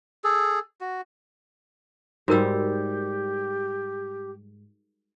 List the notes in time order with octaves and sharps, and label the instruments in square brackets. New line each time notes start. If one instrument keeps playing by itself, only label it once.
[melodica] G#4 A4
F#4
[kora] G#2 G3 [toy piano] F#4 A#4 E6 [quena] G4